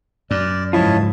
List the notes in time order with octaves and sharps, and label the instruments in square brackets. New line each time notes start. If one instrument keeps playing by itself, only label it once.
[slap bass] F#2 [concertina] D5
[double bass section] C#2 G#2 [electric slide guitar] F3 E4 F4 [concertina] C#5 D#5 A5